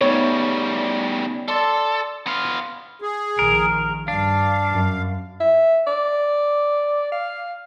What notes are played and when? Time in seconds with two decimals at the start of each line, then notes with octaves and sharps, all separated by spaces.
0.01 C#3 G3 A3 B3 D#4 C#5
1.48 A4 D5 C6 E6
2.27 B3 F5 C6
3.02 G#4
3.39 A#1 D#3 A#4
4.08 G2 D4 F5
4.72 F#2
5.40 E5
5.87 D5
7.12 F5